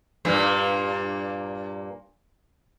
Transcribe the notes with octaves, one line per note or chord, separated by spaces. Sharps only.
G2 A#2 A#3